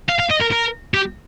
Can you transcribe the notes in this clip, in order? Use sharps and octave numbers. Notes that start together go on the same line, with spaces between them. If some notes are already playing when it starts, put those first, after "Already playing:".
F5
F5
D#5
A#4
A#4
G4